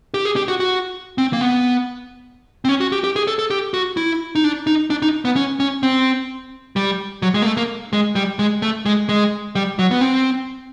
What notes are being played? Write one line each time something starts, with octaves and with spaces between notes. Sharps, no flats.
G4
G#4
G4
F#4
F#4
C4
A#3
B3
C4
C#4
F#4
G4
G4
G#4
A4
A4
G4
F#4
E4
D#4
D4
D#4
D4
D#4
B3
C#4
C#4
C4
G3
F#3
G#3
A#3
A3
A#3
G#3
G3
G#3
A3
G#3
G#3
G3
F#3
B3
C4